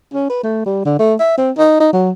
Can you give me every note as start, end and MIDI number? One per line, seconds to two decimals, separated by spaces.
0.14 0.29 61
0.29 0.40 71
0.43 0.64 57
0.66 0.84 55
0.85 0.97 50
0.99 1.14 57
1.20 1.36 76
1.37 1.51 60
1.58 1.77 63
1.80 1.88 63
1.93 2.10 54